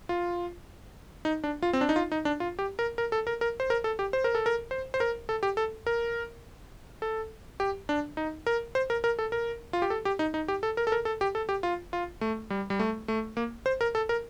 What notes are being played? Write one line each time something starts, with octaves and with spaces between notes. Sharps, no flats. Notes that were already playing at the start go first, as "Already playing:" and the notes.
F4
D#4
D4
F4
C4
D4
D#4
F4
D#4
D4
F4
G4
A#4
A#4
A4
A#4
A#4
C5
A#4
A4
G4
C5
A#4
A4
A#4
C5
C5
A#4
A4
G4
A4
A#4
A4
G4
D4
D#4
A#4
C5
A#4
A#4
A4
A#4
F4
G4
A4
G4
D#4
D#4
G4
A4
A#4
A4
A#4
A4
G4
A4
G4
F4
F4
A3
G3
G3
A3
A3
A#3
C5
A#4
A4
A#4